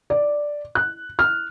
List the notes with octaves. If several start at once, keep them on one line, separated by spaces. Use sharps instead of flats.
D5
F#6
F6